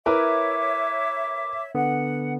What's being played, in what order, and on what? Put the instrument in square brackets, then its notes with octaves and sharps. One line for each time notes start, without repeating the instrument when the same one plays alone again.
[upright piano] E4 A#4 B4 [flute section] C#5 E5 [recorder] D6
[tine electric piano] D3 B3 [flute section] F#5